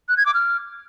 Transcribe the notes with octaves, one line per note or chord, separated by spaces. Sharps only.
F#6
G#6
D6
F6